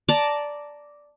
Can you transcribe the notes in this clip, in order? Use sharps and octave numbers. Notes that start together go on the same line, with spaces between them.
D5 A5 A#5